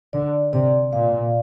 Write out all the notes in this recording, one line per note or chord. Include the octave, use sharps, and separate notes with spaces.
D3 D5
C3 D5
A#2 F5